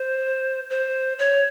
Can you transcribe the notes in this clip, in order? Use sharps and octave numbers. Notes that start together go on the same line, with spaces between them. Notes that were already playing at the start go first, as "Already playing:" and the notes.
Already playing: C5
C5
C#5